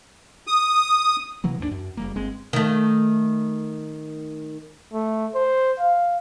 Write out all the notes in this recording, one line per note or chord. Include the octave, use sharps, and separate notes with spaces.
D#6
C3 E3 F#3 A#3
D#2 G#2 A#3 D4
F#2
F#1 G3 A#3
G1 G#3 C4
D#3 A3
A3
C5
F5